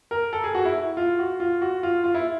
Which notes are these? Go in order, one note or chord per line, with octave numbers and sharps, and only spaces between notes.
A#4
A4
G#4
F#4
E4
F4
F#4
F4
F#4
F4
F4
E4